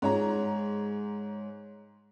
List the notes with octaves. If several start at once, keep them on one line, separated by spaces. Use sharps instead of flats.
G#2 C#5 A#5